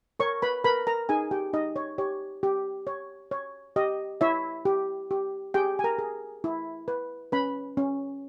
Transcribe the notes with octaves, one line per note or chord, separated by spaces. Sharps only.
A#4 C#5 C#6
B4 B5
A#4 B4 B5
A#4 A#5
D#4 G#4 G#5
G4 G5
D#4 D#5
C#5
G4 C#5
G4
C#5
C#5
G4 D#5
E4 C#5 E5
G4
G4
G4 G#4 G5
G#5
A#4 A#5
G#4
E4
B4
C#4 B4 B5
C#4